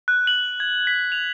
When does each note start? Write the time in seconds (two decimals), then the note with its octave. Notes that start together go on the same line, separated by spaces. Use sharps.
0.08 F#6
0.27 F#7
0.60 G#6
0.87 B6
1.12 F7